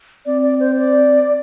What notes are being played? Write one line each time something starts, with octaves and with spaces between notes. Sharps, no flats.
C4 D5
D5
C5
D5